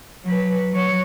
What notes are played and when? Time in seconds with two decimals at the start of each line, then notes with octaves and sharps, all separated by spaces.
0.25 F#3 B4
0.72 F#3 C#5